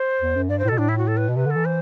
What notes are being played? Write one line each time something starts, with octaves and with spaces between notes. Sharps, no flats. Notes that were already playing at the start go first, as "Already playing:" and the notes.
Already playing: C5
E2
F#2
G2 D5
C5
A2
B2 A4
A2 D4
E4
F#4
A4
B4
B2
C3 B4
D3
A4
E3
C5